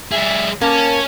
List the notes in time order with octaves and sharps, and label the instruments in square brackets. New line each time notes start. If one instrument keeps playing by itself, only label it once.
[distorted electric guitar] G3 G#4 [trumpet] E5
[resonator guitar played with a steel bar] A#3 [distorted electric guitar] C#4 [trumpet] A5